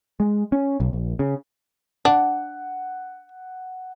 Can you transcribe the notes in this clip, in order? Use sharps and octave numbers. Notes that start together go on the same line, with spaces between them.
G#3
C#4
B1
A#1
C#3
D4 F#5